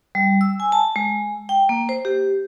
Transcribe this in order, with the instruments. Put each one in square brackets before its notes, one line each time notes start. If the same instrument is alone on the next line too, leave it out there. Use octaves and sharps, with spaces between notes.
[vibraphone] G3
E6
G#5
A5
G#3
G5
A#3
C5
G4